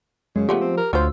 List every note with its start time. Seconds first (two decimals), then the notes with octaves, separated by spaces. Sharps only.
0.36 F#2 C#3 G#3
0.49 F3 G#3 A3 B3 G4
0.61 C4
0.77 A#4
0.93 D2 F#3 F4 C5 E6